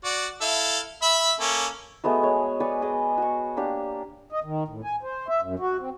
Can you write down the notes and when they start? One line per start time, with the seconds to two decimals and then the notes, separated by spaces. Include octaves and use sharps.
0.04 F#4 D5
0.41 E4 A4 F5
1.02 E5 B5 E6
1.40 A#3 C#4 A4
2.04 G#3 A3 B3 F#4
2.23 G#3 C#5
2.60 B4 D5 G#5 C#6
2.82 G#4 D#5 D6
3.18 F#4 C#6
3.57 A#3 D4 G4
4.32 D#5
4.44 D#3
4.68 A2
4.84 G#5
5.03 C5
5.28 E5
5.42 F#2
5.59 F#4
5.80 C4